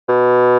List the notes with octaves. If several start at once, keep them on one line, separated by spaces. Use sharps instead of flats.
B2